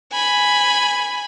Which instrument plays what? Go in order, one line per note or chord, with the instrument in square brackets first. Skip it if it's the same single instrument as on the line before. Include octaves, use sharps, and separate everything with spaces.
[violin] G#5 B5